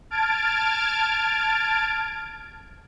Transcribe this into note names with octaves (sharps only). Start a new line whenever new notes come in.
A5 F6 G#6 A6 D7